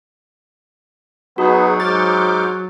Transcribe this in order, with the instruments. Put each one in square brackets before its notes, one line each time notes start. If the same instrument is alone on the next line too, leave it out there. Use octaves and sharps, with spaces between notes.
[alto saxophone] F#3 [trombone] B3 [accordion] D#4 G#4 [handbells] F#4
[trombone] G#2 [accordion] D6 F6 G6 [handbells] A6